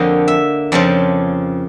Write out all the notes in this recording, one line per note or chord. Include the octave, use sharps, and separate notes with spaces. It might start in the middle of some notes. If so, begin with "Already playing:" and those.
Already playing: F2 D3 F3 A#3 D#5
E5
F2 C#3 F3 D5